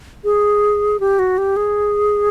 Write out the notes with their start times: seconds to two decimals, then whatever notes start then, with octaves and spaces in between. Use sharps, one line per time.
0.24 G#4
1.00 G4
1.19 F#4
1.38 G4
1.56 G#4